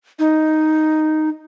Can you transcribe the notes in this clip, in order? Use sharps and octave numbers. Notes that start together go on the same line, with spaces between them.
D#4